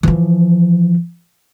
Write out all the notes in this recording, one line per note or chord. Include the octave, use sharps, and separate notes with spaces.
E3 F3